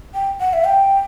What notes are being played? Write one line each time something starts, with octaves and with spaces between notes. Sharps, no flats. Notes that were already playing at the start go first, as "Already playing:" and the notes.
G5
F#5
E5
G5